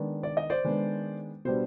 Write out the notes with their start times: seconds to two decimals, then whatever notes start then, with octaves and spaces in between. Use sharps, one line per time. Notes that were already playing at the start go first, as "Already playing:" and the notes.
Already playing: D#3 G#3 B3 D4
0.23 D5
0.37 D#5
0.50 C5 D5
0.64 D#3 G#3 B3 D4
1.45 B2 G3 B3 D4 C5